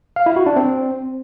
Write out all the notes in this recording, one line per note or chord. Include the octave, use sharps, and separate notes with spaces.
F5
E4
F#4
D4
C4